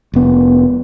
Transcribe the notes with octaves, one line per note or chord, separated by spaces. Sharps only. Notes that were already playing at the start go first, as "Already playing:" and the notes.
F1 B3